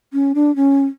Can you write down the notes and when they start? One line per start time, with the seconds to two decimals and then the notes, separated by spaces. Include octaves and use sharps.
0.13 C#4
0.35 D4
0.56 C#4